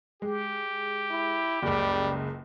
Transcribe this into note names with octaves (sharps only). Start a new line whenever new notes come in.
G#3 G4
E4
F#1 C#2 G3